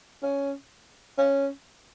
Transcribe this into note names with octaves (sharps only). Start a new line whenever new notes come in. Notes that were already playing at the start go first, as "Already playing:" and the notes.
C#4
C#4